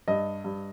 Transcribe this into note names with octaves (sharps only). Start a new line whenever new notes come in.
G2 D#5
G2